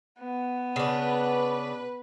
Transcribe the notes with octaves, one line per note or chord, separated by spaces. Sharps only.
B3
C#3 D4 B4